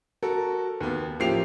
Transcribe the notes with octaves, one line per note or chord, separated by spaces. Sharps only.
F#4 A4 A#4
D#2 B3
A1 F3 A#3 G4 C7 F7